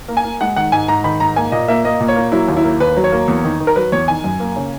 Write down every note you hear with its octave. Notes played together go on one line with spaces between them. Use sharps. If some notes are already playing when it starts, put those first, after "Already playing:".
A#3
G#5
A#3
G#3 F#5
D#3 F#5
G#2 G#5
G#2 A#5
D#3 B5
G#2 A#5
A#3 G#5
A#2 D#5
A#3 E5
A#3 D#5
A#2
C#5
A#3
F#3 E4
D#2
E4
A#3
D#2 B4
F#3
C#5
A#3
E2
D#3
D#3
A#4
F#3 B4
E2 C#5
D#3 G#5
F#2
A#3
C#3